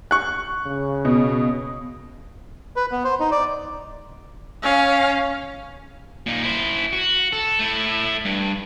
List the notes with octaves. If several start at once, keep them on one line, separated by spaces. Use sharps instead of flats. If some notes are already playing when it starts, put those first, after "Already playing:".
C#6 F#6
C#3
B2
B4
B3
C5
D#4
D5
C#4 F5
A#2 D#4
E4 C5
F#4
A4
A3 E4
G2